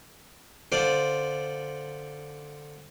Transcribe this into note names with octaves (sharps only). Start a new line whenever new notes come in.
D3 F4 C5 D5